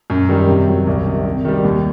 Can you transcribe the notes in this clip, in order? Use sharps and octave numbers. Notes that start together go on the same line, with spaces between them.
F#2
D#3 G3
C3
D#3 F#3
C2
C3 D#3
C3
D#3 G3
D#2